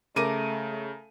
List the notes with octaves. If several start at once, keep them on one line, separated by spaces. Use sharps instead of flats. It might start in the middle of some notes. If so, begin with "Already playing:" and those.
C#3 A3 A#4 D6 D#7